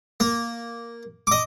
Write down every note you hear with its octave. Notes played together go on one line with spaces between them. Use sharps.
A#3
D#5 D6